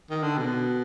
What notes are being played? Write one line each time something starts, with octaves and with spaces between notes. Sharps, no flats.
D#3
D3
B2